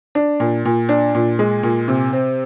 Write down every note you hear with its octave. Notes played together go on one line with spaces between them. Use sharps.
D4
A#2
A#2
D4
A#2
G#3
A#2
C3
C4